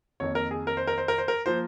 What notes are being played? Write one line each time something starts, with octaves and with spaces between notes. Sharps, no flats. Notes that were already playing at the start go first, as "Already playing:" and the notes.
F2 D#3 A#3 C#5
A#4
G#4
A#4
C5
A#4
C5
A#4
C5
A#4
F3 A#3 C5